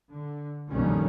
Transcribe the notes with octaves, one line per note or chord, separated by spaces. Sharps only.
D3
A#1 F2 B2 D#3 G3 C#4